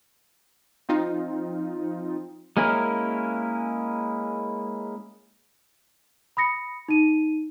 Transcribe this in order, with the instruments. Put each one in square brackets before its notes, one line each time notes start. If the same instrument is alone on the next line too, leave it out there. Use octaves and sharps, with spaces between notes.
[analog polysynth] F3 C4 D#4 F4
[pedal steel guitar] G#3 A#3 C#4 E4 A#4
[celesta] B5 D#6 A#6 C#7
D#4 D#7